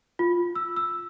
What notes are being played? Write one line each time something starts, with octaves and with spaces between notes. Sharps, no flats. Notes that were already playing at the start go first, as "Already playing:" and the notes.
F4
E6
E6